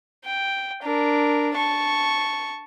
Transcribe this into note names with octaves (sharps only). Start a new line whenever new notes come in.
G5
D4 A#4
A5 C#6